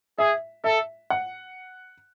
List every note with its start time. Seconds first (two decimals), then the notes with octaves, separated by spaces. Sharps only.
0.19 G#4 E5
0.64 A4 E5
1.10 F#5